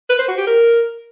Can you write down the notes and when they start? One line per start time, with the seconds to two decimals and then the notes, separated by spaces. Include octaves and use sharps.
0.10 B4
0.19 C5
0.28 F#4
0.38 G4
0.47 A#4